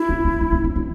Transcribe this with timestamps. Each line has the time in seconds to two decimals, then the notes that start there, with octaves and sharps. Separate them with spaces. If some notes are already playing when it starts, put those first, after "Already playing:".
Already playing: E4
0.09 C#4
0.24 C4
0.41 C4
0.52 C#4
0.64 C4
0.76 C#4